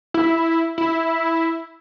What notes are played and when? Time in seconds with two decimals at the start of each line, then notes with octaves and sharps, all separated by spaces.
0.14 E4
0.78 E4